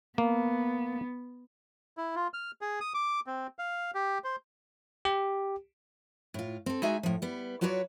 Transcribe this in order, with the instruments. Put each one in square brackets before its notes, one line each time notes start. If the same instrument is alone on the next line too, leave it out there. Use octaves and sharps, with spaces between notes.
[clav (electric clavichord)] A#3 [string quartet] B3
[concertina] E4
F4
F6
G#4
D#6
D6
C4
F5
G4
C5
[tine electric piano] G4
[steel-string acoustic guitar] A2 F4
C4 A4
G#3 D#4 F#4 G#4 E5 G#5
A2 F3
G3 B3
F#3 F4 F#4 B4 C#5 D5